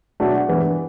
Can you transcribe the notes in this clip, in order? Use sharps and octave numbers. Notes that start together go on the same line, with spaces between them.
B2 F#3 A3 D4 F#4
G2 E3 B3